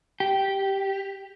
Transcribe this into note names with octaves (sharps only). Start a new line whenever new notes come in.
G4